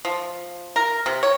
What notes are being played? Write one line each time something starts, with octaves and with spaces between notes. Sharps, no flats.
F3
A#4
C3
C#5